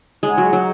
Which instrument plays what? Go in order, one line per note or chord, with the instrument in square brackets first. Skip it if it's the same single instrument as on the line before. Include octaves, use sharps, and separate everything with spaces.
[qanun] G#3 [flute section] D#4 G#4 C#5 F#5
[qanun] F#3
F#3